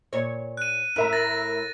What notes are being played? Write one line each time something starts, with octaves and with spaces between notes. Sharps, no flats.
A#2 C#5
F#6 D#7
A2 A#4 E5 A#5
A6 A#6